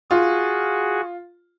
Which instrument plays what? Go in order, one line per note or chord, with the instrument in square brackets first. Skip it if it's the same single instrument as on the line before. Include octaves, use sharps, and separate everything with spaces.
[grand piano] F4 [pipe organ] F#4 G#4